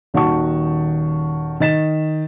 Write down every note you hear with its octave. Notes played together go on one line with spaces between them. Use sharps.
D#1 D#3 F#4 F#5 A5 C#6
D#3 D#5 A6 B6 E7